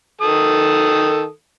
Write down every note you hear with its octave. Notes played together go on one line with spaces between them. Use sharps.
D#3 A4 D#6